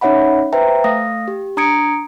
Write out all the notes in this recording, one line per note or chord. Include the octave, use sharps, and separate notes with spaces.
C#4 D#4 C#5 E5 F#5 B5
B4 C5 E5 G5 A#5
A3 F5 D#6 A#6
G4
D4 A#5 D#6 G#6 C#7 D7